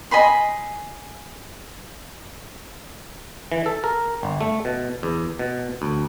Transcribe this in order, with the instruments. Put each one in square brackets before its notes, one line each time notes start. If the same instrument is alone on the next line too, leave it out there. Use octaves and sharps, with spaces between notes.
[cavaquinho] D#5 G#5 B5 C6
[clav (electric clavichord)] E3
A4
A#4
G1
A3
B2
E2
B2
D2